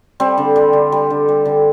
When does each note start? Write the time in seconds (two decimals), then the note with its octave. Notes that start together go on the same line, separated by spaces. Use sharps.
0.20 G3 C4
0.38 D3
0.56 G3
0.73 D3
0.92 G3
1.10 D3
1.28 G3
1.45 D3